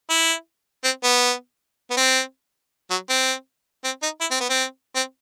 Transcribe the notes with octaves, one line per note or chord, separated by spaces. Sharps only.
E4
C4
B3
B3
C4
F#3
C4
C4
D#4
E4
C4
B3
C4
C4